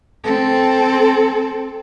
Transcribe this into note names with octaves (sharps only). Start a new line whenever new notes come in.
C4 A4